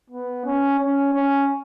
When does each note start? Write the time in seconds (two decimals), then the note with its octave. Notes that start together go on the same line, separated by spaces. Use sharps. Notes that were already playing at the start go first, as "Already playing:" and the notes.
0.10 B3
0.45 C#4
0.79 C#4
1.14 C#4